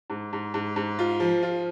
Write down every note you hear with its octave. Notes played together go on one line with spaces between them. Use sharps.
G#2
G#2
G#2
G#2
F4
F3
F4